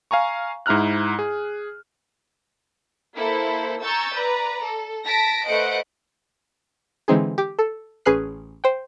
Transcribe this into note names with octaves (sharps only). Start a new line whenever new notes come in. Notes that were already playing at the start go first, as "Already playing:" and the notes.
F5 G#5 A#5 C#6
G#2 E4 A#5 F6 F#6
G#4
A#3 E4 A4 C5
G#5 A#5 C#6 E6 G6 A6
B4 D5 A#5
A4
A5 A#6 B6 D7
A3 B4 C5 D#5 F#5 D7
D3 E3 G#3 C4 D#4 G#4
G4 D6
A4
A1 C#4 G#4 B4 F#6 C7
C5 G5